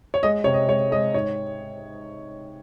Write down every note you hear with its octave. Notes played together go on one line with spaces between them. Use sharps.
C#5
G#3 D#5
C3 C#5
D#5
G#3 C#5
G#3 D#5
G#2 C#5